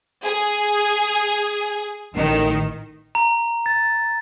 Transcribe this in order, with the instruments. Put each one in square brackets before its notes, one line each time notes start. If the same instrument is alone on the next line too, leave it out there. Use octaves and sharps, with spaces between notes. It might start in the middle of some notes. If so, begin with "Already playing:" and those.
[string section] G#4
A1 D#3
[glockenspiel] A#5
A6